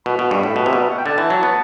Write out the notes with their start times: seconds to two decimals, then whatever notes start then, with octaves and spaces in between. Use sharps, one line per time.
0.06 B2 B5
0.19 B2
0.31 G2
0.43 A2
0.56 B2
0.66 C3
0.73 B2 D5
0.83 E5
0.90 F#5
0.98 G5
1.06 D3 A5
1.18 E3
1.30 F#3
1.43 B3